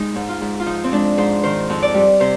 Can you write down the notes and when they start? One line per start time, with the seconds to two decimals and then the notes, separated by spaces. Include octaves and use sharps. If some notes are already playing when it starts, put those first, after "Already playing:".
Already playing: G#3 D#4
0.16 G#2
0.29 F4
0.41 G#2
0.60 F4
0.66 F3 D#4
0.84 C4
0.92 G#3 D4
1.18 G#2 C5
1.44 D#3 C5
1.70 F2
1.82 D5
1.94 G3
2.20 C3 C5